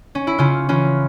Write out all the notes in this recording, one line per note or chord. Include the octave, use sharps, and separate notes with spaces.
C#4
E4
C#3 C#4 F4
E3 C#4 F4